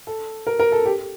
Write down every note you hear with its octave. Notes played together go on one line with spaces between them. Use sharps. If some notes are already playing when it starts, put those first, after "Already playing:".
A4
A#4
A#4
A4
G4